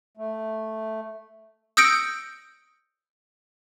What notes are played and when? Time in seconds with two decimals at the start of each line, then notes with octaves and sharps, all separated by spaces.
0.17 A3
1.77 D#6 E6 G6 A#6 C#7 D7